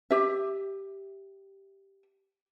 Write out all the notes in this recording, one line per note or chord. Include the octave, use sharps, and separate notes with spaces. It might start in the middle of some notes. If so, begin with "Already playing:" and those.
G4 E5